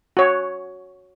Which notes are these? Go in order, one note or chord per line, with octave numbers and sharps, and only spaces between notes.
F#4 C#5